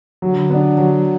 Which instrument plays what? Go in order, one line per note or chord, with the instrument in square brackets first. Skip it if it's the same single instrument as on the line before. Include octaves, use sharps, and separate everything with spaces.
[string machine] D3 [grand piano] F#3
[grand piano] B3 D4
F#3